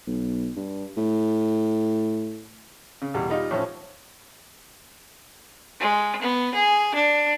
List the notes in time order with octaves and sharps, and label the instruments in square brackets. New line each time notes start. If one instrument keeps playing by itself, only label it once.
[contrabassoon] B1
G2
A2
[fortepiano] C#3
E2 B2 G3
G3 D#4 F4
A2 F3 C#4
[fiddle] G#3
B3
G#4
D4